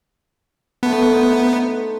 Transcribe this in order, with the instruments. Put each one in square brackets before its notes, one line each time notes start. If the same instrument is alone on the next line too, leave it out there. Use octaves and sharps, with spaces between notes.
[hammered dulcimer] D3 A3 [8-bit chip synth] B3
[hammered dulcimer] D#4 A4 C5